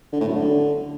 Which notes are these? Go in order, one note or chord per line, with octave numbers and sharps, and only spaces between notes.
D3
A2
F#2
D3